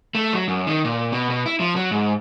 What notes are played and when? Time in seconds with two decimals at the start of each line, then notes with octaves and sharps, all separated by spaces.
0.15 A3
0.33 F#3
0.48 F#2
0.67 D#3
0.84 A#2
1.12 B2
1.30 B2
1.46 E4
1.60 F3
1.76 F#3
1.91 G#2